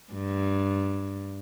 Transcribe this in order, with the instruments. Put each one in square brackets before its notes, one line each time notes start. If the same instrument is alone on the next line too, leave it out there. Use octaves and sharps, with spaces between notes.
[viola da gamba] G2